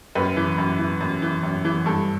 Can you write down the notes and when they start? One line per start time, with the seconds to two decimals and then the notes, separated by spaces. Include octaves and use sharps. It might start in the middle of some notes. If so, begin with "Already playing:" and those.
0.15 F#2 B4
0.36 E3
0.58 F#2
0.79 E3
1.01 F#2
1.22 E3
1.43 F#2
1.65 E3
1.86 G2 A4